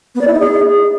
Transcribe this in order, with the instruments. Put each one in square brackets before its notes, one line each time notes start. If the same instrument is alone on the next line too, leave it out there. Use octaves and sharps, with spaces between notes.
[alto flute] B3
D5
E4
D#4
G#4